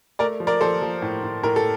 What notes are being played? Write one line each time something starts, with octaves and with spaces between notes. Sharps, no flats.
A3 A#4 D5
F3
A#4 D5
F3 A4 C5
F3
A2
A2
A2 A#4
A4